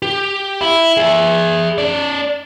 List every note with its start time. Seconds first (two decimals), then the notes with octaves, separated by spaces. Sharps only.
0.02 G4
0.61 E4
0.97 G#4 E5
1.78 C#4 D5